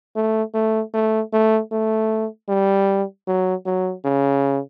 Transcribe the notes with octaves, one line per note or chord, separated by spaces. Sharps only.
A3
A3
A3
A3
A3
G3
F#3
F#3
C#3